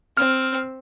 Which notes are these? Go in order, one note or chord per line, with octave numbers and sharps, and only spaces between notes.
C4 F6